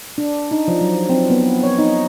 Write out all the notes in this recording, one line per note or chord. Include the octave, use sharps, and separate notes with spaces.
D4
D#4
F3
F#3
C4
B3
C#5
D#4